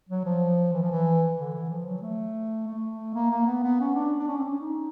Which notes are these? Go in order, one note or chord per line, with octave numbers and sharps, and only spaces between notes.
F#3
F3
E3
F3
E3
D3
E3
F3
F#3
A3
A3
A#3
A#3
B3
B3
C#4
D4
D4
C#4
C4
C#4
D#4